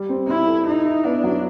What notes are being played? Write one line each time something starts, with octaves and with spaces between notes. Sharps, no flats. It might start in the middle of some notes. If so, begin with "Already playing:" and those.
Already playing: G3
C4
C4 E4
A4
D#4 E4
E4
B3 D4
F#3